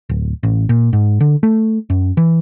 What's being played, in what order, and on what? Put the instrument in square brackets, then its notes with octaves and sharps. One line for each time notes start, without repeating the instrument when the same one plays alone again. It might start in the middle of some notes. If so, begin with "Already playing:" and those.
[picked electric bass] D1
A1
A#2
G#2
D3
A3
F#2
E3